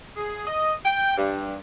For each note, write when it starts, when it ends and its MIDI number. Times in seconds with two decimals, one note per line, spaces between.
0.16 0.46 68
0.47 0.73 75
0.85 1.15 79
1.17 1.55 43